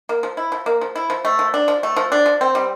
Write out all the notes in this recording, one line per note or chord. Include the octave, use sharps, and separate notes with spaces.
A#3
F3
E4
F3
A#3
F3
E4
F3
A3
F3
D4
F3
A3
F3
D4
F3
C4
G3